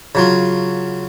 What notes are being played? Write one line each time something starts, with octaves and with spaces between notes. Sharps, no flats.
C#3 F#3 F4